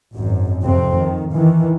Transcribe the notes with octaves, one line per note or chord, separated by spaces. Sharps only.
G#1 F#2
F2 C3 C4
D#3
D#3 E3